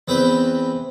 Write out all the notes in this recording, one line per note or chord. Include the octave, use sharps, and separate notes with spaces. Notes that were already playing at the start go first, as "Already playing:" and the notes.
E2 C4 B4 G5